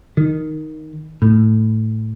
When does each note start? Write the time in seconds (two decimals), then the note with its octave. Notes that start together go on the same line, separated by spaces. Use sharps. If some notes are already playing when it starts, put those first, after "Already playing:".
0.17 D#3
1.22 A2